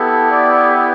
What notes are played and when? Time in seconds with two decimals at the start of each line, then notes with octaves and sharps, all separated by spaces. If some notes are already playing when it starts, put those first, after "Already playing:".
Already playing: B3 E4 G4 A4
0.31 D5